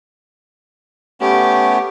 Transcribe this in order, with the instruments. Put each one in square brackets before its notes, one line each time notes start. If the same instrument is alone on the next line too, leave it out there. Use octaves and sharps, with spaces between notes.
[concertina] A3 B3 C#4 [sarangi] G4